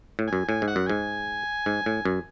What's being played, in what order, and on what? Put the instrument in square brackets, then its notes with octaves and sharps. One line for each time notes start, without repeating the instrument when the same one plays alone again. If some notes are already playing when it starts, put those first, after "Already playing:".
[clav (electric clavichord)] A2
[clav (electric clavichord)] F#2 [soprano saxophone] G#5
[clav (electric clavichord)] A2 [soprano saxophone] G#5
[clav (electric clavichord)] G#2
[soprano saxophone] F#5
[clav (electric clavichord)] F#2
[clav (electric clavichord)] G#2 [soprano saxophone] G#5
[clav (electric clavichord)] G#2
A2
F#2